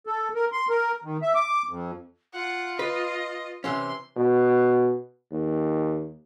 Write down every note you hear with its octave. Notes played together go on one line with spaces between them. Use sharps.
A4
A#4
C6
A#4
D#3
E5
D6
F2
F4 F#5
B4 D#5
C3 E3 C#4 C6
B2
D#2